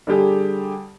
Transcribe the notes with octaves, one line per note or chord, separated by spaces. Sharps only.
D3 G3 G4 G#4